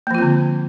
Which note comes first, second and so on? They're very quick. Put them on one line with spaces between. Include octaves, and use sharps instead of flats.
A#3 F3 F4 C4 D3